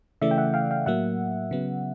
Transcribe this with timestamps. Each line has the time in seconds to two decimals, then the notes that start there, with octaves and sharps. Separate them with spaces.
0.22 C#3 E3 A3 D5 E5
0.31 G5
0.38 E5 F#5
0.54 F5 G5
0.71 F5 G5
0.86 A2 F#3 A#3 E5 F#5
1.51 C#3 F#3 B3